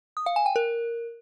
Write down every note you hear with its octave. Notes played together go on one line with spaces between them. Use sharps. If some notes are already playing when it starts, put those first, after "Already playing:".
D#6
F5
G#5
G5
A#4